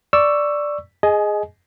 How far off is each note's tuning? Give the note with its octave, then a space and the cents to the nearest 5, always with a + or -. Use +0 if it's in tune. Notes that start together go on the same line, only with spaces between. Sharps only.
D5 +0 C#6 +0 E6 +10
G#4 +0 D#5 +0 G#5 +30